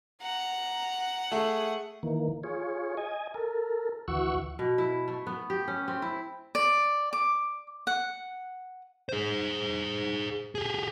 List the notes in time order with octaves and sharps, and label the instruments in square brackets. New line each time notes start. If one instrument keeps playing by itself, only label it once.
[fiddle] F#5 [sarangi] A#5
[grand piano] A3 [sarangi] G#4
[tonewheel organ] D#3 E3 A#3
F4 G#4 C#5
D#5 G#5
A4 A#4
D2 E3 F#4 F#5 C#6 E6
[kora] B2
E4
A3
B3
G4
C#4
C4
E4
[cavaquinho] D5
D6
F#5
[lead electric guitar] G#4 C5
G4 G#4